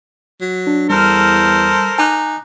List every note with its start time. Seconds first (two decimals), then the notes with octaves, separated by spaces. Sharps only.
0.41 F#3
0.67 D4
0.90 E2 G3 A4 A#4 C5 F6
1.99 D#4 G#5 D6 F#6